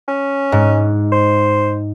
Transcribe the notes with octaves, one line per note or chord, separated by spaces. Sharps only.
C#4
G#2
C5